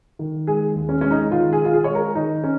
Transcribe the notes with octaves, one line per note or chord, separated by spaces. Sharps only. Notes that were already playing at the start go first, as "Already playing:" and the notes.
D#3
G#3 G#4
D#2
C#4
G#3 C#4
D#4
D#3 F4
G#4
D#3 F4
G#4
G#3 C#5
A#4
D#3 D#4
C#4